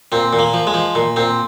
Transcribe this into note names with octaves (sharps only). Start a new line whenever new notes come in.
A#2 C4
A#2
A#3
F3
G#3
F3
A#2
A#2 C4